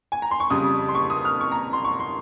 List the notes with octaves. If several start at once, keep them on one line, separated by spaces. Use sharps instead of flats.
G#5
A#5
C6
C#6
F2 C#3 G3 D#6
C6
C#6
D#6
F6
C#6
A#5
C6
C#6
C6